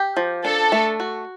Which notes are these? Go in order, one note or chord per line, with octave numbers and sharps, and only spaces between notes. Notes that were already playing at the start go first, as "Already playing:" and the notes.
Already playing: G4
F3
D4 A4
A3
F#4